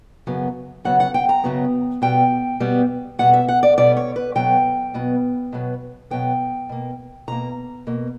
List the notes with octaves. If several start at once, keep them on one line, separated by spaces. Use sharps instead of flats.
F#2 C#3 F#3 B3
F#2 C#3 F#3 B3 F#5
F#5
G5
A#5
F#2 C#3 F#3 B3
B2 G3 B3 G5
B2 G3 B3
B2 G3 B3 F#5
E5
F#5
D5
B2 G3 B3 D5
C#5
B4
B2 F#3 B3 G5
B2 F#3 B3
B2 F#3 B3
B2 F#3 B3 G5
B2 A#3
B2 A#3 A#5
B2 A#3